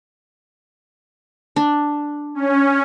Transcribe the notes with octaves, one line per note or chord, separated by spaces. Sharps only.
D4
C#4